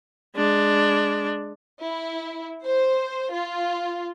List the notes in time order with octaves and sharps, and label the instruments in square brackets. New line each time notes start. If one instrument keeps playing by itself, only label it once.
[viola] G#3 D4
[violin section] E4
C5
F4